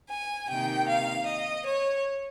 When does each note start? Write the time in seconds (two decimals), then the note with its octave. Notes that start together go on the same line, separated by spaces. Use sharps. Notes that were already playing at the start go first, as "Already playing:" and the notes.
0.09 G#5
0.48 C3 D#3 A#3 D#4 G5
0.88 F5
1.26 D#5
1.66 C#5